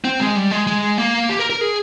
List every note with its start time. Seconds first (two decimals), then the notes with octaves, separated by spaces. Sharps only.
0.04 C4
0.20 G#3
0.36 G3
0.51 G#3
0.67 G#3
0.98 A#3
1.29 G4
1.39 A#4
1.50 A#4
1.61 G#4